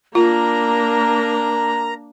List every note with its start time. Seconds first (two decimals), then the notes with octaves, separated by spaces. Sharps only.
0.15 A#3 D4 F4 A#4 A#5